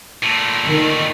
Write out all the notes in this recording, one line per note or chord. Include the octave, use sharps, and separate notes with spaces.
A#2 A3
D#3